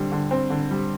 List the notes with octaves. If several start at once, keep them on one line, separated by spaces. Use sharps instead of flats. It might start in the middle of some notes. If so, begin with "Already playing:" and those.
Already playing: D3 G3 C4
D3
C4
D3
G3